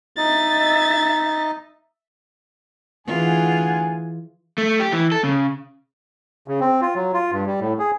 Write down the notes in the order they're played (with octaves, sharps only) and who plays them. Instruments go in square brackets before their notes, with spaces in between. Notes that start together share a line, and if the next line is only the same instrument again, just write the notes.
[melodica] D#4 D#5 [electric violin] E5 A6
[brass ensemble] D2 F#5 G#5 [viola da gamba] E3 F4 G#4
[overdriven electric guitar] A3
G4
E3
A4
C#3
[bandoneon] C#3
C4
F4
F#3
F4
G2
G3
A2
G#4